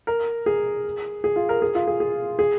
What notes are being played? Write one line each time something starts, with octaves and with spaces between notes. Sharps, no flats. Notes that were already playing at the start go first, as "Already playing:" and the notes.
A#4
G#4
G#4
F4
A#4
G#4
F4
G#4
G#4
G#4